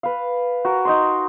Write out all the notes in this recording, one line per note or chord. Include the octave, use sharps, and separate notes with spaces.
B4 F5
F#4 A#4
D#4 D#5 C6